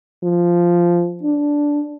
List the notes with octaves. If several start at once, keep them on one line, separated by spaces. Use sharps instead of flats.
F3
D4